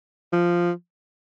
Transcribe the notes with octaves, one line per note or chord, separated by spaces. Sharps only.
F3